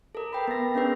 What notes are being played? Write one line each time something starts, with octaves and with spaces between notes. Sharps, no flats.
A4 A#4
B4 G5 B5
B3 A#6
B3 C#4 D4 G#4 B4